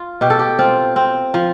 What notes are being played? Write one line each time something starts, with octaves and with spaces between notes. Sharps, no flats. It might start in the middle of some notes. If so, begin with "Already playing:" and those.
Already playing: F4
B2 G4
A4
G4
C4 F4
C4
F3